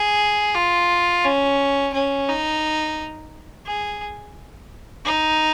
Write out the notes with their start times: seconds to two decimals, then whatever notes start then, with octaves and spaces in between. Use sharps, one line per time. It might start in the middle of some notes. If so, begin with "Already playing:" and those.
Already playing: G#4
0.55 F4
1.25 C#4
1.94 C#4
2.29 D#4
3.67 G#4
5.05 D#4